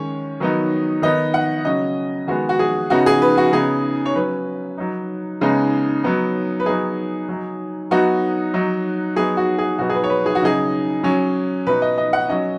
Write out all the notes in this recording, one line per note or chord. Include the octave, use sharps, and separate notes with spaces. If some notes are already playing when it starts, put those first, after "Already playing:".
Already playing: D#3 G#3 C#4 C#5
D#3 F#3 B3 D#4
D#3 B3 D#4 D#5
F#5
C#3 F#3 C#4 D#5
D#3 G#3 B3 F#4
F#4
G#4
C#3 B3 D#4 F#4
G#4
B4
F#4
C#3 B3 D#4 G#4
C#5
F#3 C#4 B4
F#3 D#4
C#3 G#3 B3 D#4
F#3 B3 D#4
B4
F#3 B3 D#4 G#4
F#3 D#4
F#3 B3 D#4 F#4
F#3 D#4
F#3 B3 D#4 G#4
F#4
G#4
B2 F#3 B3 D#4 F#4
G#4
B4
C#5
B4
G#4
F#4
C#3 F#3 D#4 G#4
F#3 C#4
B2 B3 D#4 B4
D#5
D#5
F#5
F#3 C#4 D#5